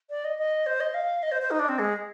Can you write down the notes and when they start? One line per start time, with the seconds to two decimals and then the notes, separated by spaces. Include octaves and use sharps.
0.10 D5
0.24 D#5
0.38 D#5
0.66 C5
0.80 D#5
0.94 F5
1.23 D#5
1.32 C5
1.42 C5
1.51 D#4
1.59 D4
1.69 C4
1.79 G#3